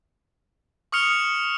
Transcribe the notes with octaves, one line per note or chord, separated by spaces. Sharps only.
C#6 D#6 F6 C#7 F7 G7